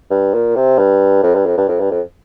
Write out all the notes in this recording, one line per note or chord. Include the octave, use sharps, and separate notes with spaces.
G2
A#2
C3
G2
F2
G2
F2
G2
F2
G2
F2